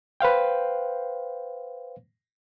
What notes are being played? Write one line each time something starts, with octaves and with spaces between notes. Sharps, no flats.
B4 C5 F5 G5